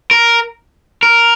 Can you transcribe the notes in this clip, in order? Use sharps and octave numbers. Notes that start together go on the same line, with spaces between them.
A#4
A#4